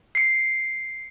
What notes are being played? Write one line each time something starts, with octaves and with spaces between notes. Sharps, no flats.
C7 C#7